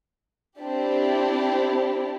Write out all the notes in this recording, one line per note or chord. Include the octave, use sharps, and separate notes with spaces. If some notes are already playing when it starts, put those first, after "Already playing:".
C4 D4 E4 G4